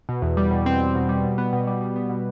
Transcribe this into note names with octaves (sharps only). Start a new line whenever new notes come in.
B2
E2
G3
B2
C4
C4
B2
G3
B2
B3
B2
G3
G3
B3
B2